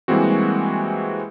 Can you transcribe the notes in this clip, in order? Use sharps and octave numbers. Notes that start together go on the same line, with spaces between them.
E3 G3 G#3 A#3 C4 F#4